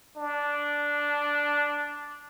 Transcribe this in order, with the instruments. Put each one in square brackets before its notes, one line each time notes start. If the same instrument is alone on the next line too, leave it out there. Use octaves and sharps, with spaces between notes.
[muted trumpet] D4